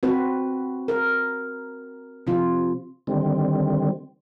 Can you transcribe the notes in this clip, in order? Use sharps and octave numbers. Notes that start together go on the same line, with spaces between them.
C4 F#4 B4
A#4
C3 F3 F4
D3 D#3 G3 C4